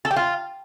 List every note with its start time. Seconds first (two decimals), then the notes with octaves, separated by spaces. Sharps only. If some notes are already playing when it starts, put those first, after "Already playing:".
0.05 A4
0.11 G4
0.16 F4